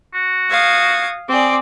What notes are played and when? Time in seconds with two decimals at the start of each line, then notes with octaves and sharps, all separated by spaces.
0.14 F#4
0.50 F5 D#6 G#6
1.29 C4 G#4 D5 D6